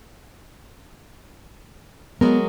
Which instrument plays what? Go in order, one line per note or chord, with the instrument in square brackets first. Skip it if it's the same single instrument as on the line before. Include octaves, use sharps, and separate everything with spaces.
[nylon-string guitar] F#3 G#3 A#4 [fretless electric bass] B3